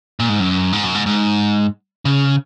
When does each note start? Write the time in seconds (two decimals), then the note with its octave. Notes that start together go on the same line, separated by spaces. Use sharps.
0.20 A#2
0.29 G#2
0.40 F#2
0.73 G#2
0.83 F#2
0.95 G#2
1.06 G#2
2.05 C#3